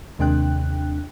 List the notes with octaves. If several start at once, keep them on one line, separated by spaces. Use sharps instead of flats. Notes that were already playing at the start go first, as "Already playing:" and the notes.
D#2 C3 G#3 D4 G5 F#6